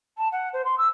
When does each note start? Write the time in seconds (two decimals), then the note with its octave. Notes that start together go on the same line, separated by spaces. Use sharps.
0.17 A5
0.32 F#5
0.53 C5
0.64 C6
0.78 E6